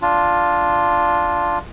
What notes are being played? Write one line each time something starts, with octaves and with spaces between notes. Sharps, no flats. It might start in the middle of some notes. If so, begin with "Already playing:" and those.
D4 F4